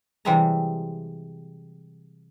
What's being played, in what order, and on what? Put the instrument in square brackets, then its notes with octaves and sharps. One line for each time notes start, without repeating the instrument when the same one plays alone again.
[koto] C3 E3 G3 G#3 E5 A#5